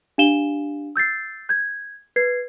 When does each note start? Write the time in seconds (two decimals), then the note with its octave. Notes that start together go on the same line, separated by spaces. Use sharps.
0.18 D4 G4 F5 E7 G7
0.96 E6 G6 A6 C7
1.49 G6 G#6
2.16 B4 G#6 C7